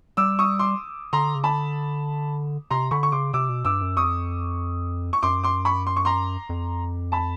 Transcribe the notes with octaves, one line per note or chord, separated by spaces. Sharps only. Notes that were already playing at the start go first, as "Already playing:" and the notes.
G3 D6 E6
C#6 D#6
C6 D6
D3 A#5 C6
C#3
D3 A5 B5
C3 A#5 C6
D3 B5 C#6
C#6
C#3 C6 D6
C3 D6 E6
B2
G2 D6 E6
F#2
F2 C#6 D#6
C#6
F#2 C6 D6
C6 D6
B5 C#6
C6
C#6
A#5 C6
F2
A5 B5